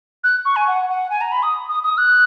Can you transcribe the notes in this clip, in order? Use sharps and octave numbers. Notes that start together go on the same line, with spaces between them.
F#6
C#6
G#5
F#5
F#5
G#5
A#5
B5
D#6
D#6
D#6
F#6